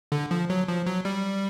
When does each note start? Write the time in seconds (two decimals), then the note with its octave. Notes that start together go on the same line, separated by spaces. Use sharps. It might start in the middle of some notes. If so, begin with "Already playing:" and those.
0.12 D3
0.31 F3
0.50 F#3
0.68 F3
0.87 F#3
1.05 G3